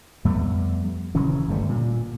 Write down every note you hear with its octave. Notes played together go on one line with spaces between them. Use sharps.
F2 G3 A3 B3
D#1 C#3 E3 C#4
G1 G2 G3 A3
A#2